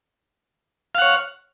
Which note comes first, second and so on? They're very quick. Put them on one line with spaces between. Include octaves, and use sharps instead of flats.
F5 F#5 C#5